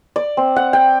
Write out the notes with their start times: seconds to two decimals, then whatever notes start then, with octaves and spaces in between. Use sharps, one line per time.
0.16 D5
0.37 C4
0.56 F#5
0.73 G5